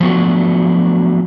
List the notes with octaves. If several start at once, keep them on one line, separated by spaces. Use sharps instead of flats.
F3 F#3 A3 B3 D4 F#4